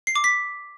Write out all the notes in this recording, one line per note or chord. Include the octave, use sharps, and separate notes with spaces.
C7
D6
B6